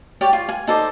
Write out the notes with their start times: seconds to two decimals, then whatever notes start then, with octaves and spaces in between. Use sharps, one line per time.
0.21 G4 C#5 D5 G5
0.33 F4
0.49 G#5
0.67 D#4 A4 C5 D5